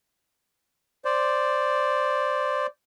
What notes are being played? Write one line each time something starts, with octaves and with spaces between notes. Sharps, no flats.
C5 D5